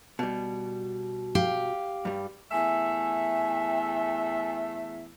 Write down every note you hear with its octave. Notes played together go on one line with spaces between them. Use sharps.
B2 G3
G4 F5
G2 G3
E2 A3 E5 G#5